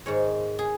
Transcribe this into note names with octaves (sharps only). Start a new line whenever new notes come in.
G#2 D#3 G#3 C#5
G#4